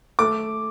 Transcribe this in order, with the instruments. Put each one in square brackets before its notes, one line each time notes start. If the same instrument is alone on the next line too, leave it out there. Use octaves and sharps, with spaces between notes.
[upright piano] A3 D6